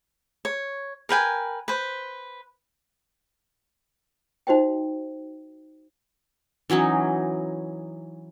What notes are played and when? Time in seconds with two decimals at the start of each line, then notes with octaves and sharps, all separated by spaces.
0.45 C#5
1.09 A#4 B4 G5 G#5
1.68 B4 C5
4.47 D#4 F#4 C5 D#5 G5
6.70 E3 F#3 C#4 D#4